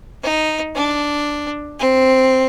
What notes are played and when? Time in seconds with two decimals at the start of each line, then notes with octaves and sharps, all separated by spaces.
0.23 D#4
0.75 D4
1.80 C4